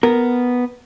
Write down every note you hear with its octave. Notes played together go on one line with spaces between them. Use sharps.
B3 A#4